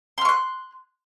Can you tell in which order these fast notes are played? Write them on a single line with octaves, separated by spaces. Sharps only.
C6 F6 C#6 F#6